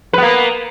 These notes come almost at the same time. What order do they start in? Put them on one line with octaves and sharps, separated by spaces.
B4 B3 A#3